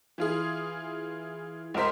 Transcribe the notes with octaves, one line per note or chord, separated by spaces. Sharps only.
E3 F4 G#4
C#2 F4 A#4 C5 B6